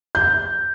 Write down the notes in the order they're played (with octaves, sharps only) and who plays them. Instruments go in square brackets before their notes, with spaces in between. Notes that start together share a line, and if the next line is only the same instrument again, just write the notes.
[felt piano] G6